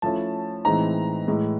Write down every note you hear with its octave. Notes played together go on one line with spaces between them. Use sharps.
F3 A3 C#4 E4 A5
A2 E3 G#3 C4 D#4 A#5
A2 E3 G#3